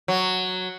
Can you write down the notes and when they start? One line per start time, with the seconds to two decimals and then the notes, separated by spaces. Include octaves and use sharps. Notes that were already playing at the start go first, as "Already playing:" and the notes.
0.08 F#3